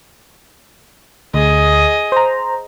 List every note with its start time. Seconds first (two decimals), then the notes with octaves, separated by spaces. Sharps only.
1.34 D2 G#4 D#5
2.12 C5 A#5